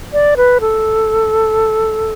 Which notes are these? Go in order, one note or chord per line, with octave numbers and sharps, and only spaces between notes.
D5
B4
A4